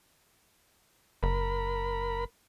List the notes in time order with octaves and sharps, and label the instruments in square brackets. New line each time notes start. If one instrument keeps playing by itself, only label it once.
[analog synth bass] F#1 [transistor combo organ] A#4 B5